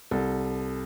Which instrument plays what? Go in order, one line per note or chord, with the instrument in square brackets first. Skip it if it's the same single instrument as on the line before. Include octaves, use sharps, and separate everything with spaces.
[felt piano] C2 A4